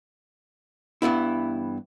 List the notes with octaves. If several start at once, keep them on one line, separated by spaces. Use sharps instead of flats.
G2 E3 B3 E4